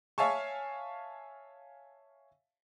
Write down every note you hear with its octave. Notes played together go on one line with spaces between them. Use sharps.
C#5 E5 F5 G#5 A5 C#6